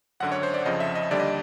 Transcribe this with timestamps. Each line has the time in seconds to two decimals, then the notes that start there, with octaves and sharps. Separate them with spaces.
0.20 G#1 F#2 D3 F#5
0.32 C#5
0.43 C5
0.54 D5
0.66 F2 C#3 F3 D#5
0.80 E5
0.95 D#5
1.11 D#2 D3 G3 D5
1.19 D#5